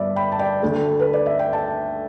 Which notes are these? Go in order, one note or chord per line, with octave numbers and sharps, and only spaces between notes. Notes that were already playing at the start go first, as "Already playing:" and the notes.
Already playing: G1 G2 D5 E5
G5 B5
A5
D5 G5
D2 D3 A3
B4
D5
E5
G5
E5 A5